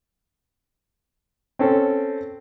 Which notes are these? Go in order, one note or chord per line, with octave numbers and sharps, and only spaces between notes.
C4 C#4 A4